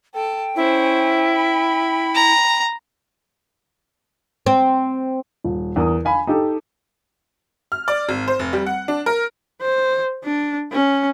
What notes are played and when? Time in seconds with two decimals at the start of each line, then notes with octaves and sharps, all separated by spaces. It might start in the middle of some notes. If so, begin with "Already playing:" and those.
0.14 A4 G5 A5
0.56 C#4 E4 C5
1.34 B5
2.15 A#5
4.46 C4
5.44 D#1
5.76 E2 A#4 D#6
6.05 F5 G#5 B5
6.27 D#4 G4 A4
7.72 F6
7.88 D5
8.09 G#1
8.28 C5
8.39 F1
8.53 G3
8.66 F#5
8.88 D4
9.06 A#4
9.61 C5
10.24 D4
10.72 C#4